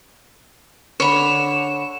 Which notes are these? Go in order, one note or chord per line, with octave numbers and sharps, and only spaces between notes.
D3 C#5 B5 E7